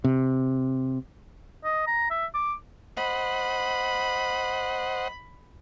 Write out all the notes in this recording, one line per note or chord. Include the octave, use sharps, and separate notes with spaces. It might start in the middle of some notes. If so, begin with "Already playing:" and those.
C3
D#5
A#5
E5
D6
C5 D#5 F#5 B5